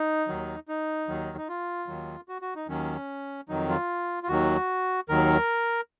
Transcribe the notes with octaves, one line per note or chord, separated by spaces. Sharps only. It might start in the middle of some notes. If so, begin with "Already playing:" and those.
Already playing: D#4
D#2 D#3 F#3
D#4
D#2 D#3 F#3
D#4
F4
D#2 D#3 F#3
F#4
F#4
D#4
D#2 D#3 F#3 C#4
F2 D#3 F#3 D#4
F4
F4
D#2 D#3 F#3 F#4
D#2 D#3 F#3 A#4